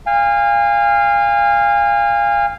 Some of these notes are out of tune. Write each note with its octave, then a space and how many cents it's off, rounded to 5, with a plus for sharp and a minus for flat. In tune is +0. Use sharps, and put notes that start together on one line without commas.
F5 -5 G#5 -35